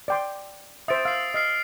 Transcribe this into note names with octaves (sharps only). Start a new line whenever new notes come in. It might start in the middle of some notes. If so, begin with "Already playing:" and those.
D5 G5 C6
C5 E5 D#6 A6 D7
F5 E6 C7
D#5 E6 F6 C7